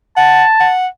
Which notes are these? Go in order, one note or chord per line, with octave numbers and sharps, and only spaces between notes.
F#5 A5
F#5